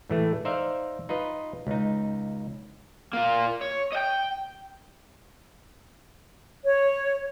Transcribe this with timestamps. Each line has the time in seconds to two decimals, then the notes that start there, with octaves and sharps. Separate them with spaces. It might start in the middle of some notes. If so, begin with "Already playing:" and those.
0.10 A2 E3 A3
0.45 D#4 C5 D5 E5 F5
1.09 D#4 F4 B4 D#5
1.67 C#2 D#4
3.14 A#3 F4
3.61 C#5
3.92 D#5 G5
6.65 C#5